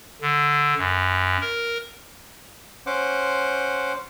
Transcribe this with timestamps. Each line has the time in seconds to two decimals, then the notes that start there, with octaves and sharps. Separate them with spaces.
0.22 D3
0.78 F#2
1.41 A#4
2.86 C#4 C5 F#5 D6